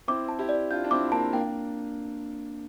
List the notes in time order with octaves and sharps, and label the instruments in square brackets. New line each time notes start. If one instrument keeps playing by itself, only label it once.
[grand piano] C4 E4 [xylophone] D6
[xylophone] A5
[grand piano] E4 G4
[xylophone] D5
[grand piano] D4 F4 [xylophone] G6
[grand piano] D4
[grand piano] C4 E4 [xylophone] D6
[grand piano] E4
[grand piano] A#3 D4 [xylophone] A5
[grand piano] A#3 D4 [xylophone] G5